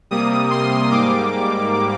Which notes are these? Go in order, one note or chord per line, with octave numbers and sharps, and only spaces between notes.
C3 G3 A#3 D#6
C6
G#2 G3 A#3 D6